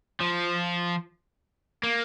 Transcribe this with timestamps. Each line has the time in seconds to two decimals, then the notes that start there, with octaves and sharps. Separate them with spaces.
0.20 F3
1.84 A#3